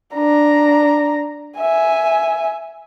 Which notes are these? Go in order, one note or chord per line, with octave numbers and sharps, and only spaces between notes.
D4 A#5
E5 G#5